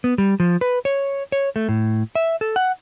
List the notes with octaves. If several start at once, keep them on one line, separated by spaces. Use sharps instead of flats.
B3
G3
F3
B4
C#5
C#5
A3
A2
E5
A4
F#5